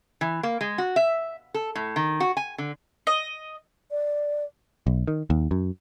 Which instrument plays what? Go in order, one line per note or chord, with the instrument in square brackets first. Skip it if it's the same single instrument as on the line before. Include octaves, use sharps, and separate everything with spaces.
[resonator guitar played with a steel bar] E3
A#3
G#3
F#4
E5
A4
A2
D#3
F#4
G#5
D3
[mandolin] D#5
[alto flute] D5
[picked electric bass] B1
D#3
D#2
F#2